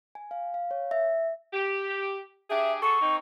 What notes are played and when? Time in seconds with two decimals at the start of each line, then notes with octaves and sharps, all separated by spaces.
0.15 G#5
0.31 F5
0.54 F5
0.71 C#5
0.91 E5
1.53 G4
2.50 D4 G4 G#4 E5
2.82 F#4 G#4 A4 C#6
3.01 A#3 C4 D#4